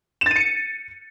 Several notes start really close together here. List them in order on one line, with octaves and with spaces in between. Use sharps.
E7 A6 D#7 C#7